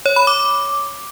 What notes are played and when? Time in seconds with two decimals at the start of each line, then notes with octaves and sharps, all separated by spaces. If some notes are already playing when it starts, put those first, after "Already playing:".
0.06 C#5
0.16 B5
0.27 D6